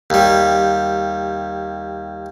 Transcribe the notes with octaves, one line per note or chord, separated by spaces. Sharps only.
D#2 G3